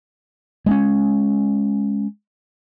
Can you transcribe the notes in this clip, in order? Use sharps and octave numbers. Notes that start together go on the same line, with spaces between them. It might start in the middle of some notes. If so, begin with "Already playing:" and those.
G#3 B3 C#4